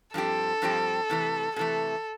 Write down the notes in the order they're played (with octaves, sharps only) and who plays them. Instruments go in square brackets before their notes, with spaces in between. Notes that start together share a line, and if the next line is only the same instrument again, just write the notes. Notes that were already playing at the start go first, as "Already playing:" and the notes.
[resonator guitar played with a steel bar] G2 F3 C4 G4 [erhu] A4
[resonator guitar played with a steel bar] G2 F3 C4 G4
C3 E3 A3
[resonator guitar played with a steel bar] C3 E3 A3 [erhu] A4